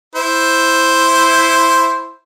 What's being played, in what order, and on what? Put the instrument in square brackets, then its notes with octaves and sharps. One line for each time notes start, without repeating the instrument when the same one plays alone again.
[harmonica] E4 C5